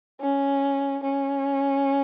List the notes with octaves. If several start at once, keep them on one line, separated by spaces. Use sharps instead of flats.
C#4
C#4